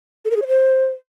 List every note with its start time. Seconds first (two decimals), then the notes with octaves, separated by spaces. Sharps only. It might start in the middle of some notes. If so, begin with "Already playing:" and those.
0.25 A4
0.31 A#4
0.36 G#4
0.42 C#5
0.48 C5